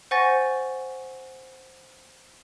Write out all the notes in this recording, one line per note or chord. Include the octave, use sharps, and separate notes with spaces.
C5 F#5 G#5 C#6 A6 A#6